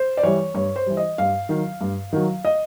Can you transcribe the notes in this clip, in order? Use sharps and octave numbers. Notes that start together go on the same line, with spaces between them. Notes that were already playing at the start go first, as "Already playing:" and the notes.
Already playing: C5
D5
E3 G3 C#5
G2 C#5
C5
E3 G3
D#5
G2 F5
D#3 F#3
G2
D#3 F#3
D#5